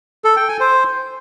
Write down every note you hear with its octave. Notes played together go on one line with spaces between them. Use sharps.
A4
G5
G#5
C5